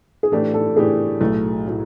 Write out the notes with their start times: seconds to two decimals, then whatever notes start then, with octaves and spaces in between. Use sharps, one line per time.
0.23 G#4
0.32 A2 E3 A3 D4 G4 A4
0.54 A4
0.76 A2 E3 A3 D4 G4 G#4
1.21 B1 A2 F#3 A3
1.67 A2 F#3 A3